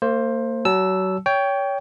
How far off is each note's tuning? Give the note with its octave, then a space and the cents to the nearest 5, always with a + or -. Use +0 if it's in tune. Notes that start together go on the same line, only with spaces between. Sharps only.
A#3 -35 C5 +15
F#3 +30 A5 -20 E6 +0
C#5 +25 G5 +0